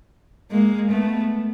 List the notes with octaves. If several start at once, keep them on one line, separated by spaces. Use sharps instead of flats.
G#3 A#3
A3 B3